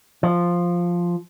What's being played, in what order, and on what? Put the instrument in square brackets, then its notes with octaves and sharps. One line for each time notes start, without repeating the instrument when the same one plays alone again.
[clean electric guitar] F3